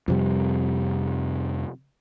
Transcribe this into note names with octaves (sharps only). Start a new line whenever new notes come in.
F2 C3 G3